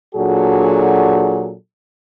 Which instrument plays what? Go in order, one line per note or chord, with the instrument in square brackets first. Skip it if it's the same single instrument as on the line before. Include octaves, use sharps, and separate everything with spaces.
[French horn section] A#2 F#3 D4 F#4 G#4 A4